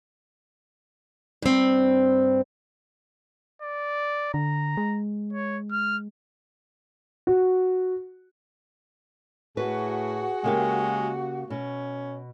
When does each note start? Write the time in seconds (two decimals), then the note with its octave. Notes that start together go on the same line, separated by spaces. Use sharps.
1.42 G2 C4
3.62 D5
4.34 D3 A#5
4.77 G#3
5.33 C#5
5.71 F6
7.27 F#4
9.57 A2 F#4 G#4 B4
10.44 C#3 G#3 A#3 G4
11.50 B2 C#4